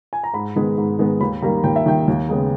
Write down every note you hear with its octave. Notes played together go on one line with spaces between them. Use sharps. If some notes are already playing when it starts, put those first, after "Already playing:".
G#5
A#5
G#2 B5
D#3 G#3 B3
G#2
D#3 G#3 B3
D#2 B5
D#3 G3 A#3 A#5
D#2 G5
E5
D#3 G3 A#3 G5
D#2
C#3 G#3 B3